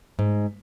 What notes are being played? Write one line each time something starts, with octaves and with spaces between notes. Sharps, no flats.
G#2